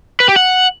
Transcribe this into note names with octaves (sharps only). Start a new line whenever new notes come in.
B4
G4
F#5